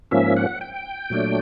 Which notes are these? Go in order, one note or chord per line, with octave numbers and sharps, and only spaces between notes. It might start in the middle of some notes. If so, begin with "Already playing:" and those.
G#2 F3 A#3 C#4 E5
F#5
G5
A#2 F#3 A3 D4